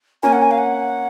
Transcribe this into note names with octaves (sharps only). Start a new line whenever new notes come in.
A#3 C#4 G#5
F#5
G#5
F5
F#5